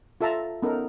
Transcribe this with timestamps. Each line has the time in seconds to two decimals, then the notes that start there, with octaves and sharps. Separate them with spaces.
0.21 F4 A4 E5 A5 A#5
0.62 B3 C#4 D#4 A4 A#4